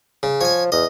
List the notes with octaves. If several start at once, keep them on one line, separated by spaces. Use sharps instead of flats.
C#3
F3 C#5 G#5
E2 D#5